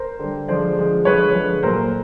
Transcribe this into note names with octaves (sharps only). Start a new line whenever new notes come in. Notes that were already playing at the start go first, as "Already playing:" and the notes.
Already playing: A#4 C5
D3 G3
D3 F3 G#3 C5 D5
D3 F3 G#3
D3 F3 G#3 B4 C#5
D3 F3 G#3
A#2 F#3 A3 A#4 C5